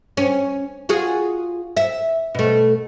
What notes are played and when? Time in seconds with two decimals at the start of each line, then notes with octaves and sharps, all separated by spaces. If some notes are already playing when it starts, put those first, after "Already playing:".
0.17 C#4
0.89 F4 F#4 G#4
1.77 E5
2.35 B2 A3